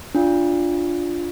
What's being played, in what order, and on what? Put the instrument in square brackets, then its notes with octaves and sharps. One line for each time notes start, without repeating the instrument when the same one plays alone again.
[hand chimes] D4 F4